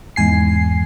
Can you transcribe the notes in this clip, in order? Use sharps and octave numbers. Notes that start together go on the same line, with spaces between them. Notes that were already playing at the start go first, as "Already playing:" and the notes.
E2 G#2 G#5 C7